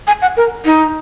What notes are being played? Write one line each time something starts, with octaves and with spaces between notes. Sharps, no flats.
G#5
F#5
A#4
D#4